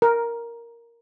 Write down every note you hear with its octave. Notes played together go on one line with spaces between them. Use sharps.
A#4